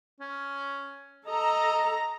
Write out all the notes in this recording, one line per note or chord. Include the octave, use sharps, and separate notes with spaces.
C#4
A4 D#5 A#5